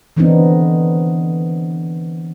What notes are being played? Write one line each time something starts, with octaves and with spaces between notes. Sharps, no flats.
D3 E3 B3 C4 D4 D#4